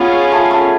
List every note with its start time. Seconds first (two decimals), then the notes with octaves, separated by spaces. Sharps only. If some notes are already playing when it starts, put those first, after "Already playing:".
Already playing: B3 C#4 F4 G#4
0.32 A3
0.51 A3